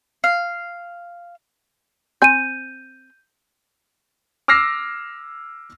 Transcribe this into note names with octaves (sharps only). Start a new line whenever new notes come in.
F5
C4 G#5 G6 D#7
D6 E6 F6 A#6 C7